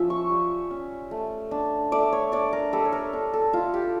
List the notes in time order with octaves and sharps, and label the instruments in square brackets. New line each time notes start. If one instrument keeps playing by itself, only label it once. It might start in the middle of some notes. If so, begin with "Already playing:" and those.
Already playing: [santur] F3 C#4 E5
C#6
G3
C#4
A3
D4
A3 D5
C#5
D4 D5
A#4
G3 A4
C#5
A#4
D4 A4
A4
E4 F4
G4